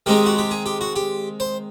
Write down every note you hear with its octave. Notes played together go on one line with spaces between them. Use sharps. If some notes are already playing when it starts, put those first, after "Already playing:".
D#3 G#3 C4 D#4 G4
F#4
G4
G#4
G4
F#4
G4
C5